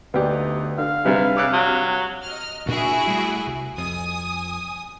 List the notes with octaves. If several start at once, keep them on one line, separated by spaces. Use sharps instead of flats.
D2 B3 D#4 G4 D5
D3 F5
G#2 C3 G3 D4 G#4 B4 E5
C#3 D6 E6 F#6
F#3 G4
D#5 F6
D2 A#2 D4 E4 F#4 G#4
G3 A3
C2
F2 G#5 D#6